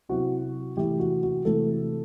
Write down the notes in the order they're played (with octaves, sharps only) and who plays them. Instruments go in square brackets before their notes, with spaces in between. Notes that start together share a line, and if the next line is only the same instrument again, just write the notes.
[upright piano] C3 F#3 C4 E4 F#4
C3 E3 A3 E4 G4
F#4
F#4
C3 E3 A3 E4 A4